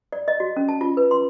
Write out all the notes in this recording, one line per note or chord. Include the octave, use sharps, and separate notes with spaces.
D5
D#5
F#4
C#4
A5
F4
B4
C6